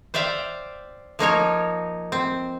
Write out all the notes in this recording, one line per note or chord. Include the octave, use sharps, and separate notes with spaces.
C5 D5 E5 F5 G5
F3 A#3 D#4 C#5
C4